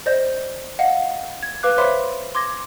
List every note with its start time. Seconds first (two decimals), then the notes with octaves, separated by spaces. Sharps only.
0.06 C5 D5 D#5 G6
0.79 D#5 F5 F#5
1.43 G#6
1.63 B4 F5 D6 F#6
1.78 C5 C#5 E5 B5 C6 D6
2.35 C6 D6 G#6 A#6